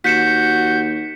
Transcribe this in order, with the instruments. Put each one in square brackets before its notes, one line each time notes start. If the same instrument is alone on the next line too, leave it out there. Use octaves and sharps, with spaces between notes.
[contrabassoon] D#2 [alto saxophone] F#4 [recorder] G6 [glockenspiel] B6 C#7 E7